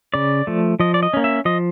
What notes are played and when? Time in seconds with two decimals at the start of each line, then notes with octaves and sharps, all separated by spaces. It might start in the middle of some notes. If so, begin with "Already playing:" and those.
0.14 C#3 D5
0.47 F3 A3
0.80 F3 D#5
0.94 D5
1.03 D#5
1.14 A#3 C#4
1.24 E5
1.45 F3 D#5